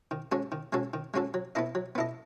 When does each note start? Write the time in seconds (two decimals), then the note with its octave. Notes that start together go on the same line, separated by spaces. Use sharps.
0.11 D#3
0.32 G#3 C#4 F#4 A4
0.52 D#3
0.73 G#3 C#4 F#4 A4
0.94 D#3
1.14 G#3 C#4 F#4 A4
1.34 F#3
1.55 B3 E4 A4 D#5
1.75 F#3
1.95 B3 E4 A4 D#5